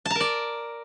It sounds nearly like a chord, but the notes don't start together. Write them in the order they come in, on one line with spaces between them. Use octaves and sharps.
A5 A#5 A#4 D5